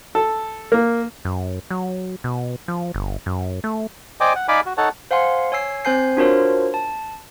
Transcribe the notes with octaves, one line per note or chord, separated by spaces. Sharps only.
A4
A#3
F#2
F#3
B2
F3
G1
F#2
A3
C5 D5 D#5 G5 G#5 D6
F#5
D#4 D5 F5 G#5 B5 D6
F#4
D#4 A4 C#5 F#5 A5
C5 F5 F#5 G#5 C6
C#5 G#5 E6 C7
C4 C5 G#5 G6 C7
D4 F4 F#4 A#4 C5 C#5
A5